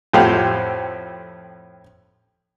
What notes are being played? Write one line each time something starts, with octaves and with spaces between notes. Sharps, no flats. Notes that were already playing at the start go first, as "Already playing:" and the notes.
F2 A2 G4 C5 F5 F#5